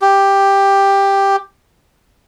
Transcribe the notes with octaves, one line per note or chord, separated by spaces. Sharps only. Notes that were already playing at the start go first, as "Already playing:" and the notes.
G4